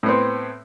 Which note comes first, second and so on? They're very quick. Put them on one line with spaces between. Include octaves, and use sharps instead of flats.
A2 B3 C4